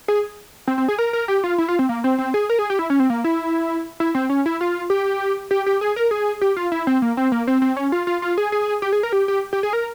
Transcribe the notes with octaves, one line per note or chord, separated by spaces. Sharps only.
G#4
C4
C4
G#4
A#4
A#4
G4
F4
E4
F4
C4
A#3
C4
C4
G#4
A#4
G#4
G4
E4
C#4
C4
A#3
E4
E4
C4
C#4
E4
F4
G4
G4
G4
G#4
A#4
G#4
G4
F4
E4
C4
A#3
C4
A#3
C4
C4
C#4
F4
F4
F4
G#4
G#4
G4
G#4
A#4
G4
G4
G4
G#4
A#4